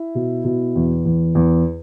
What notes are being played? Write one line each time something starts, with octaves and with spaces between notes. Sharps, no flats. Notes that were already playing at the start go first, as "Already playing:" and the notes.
Already playing: E4
B2
B2
E2
E2
E2